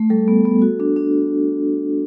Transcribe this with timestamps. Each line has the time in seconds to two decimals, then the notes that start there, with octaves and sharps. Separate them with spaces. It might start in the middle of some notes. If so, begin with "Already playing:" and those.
Already playing: A3
0.10 G3 A4
0.28 B3
0.45 B3
0.62 F#4
0.80 D4
0.96 D4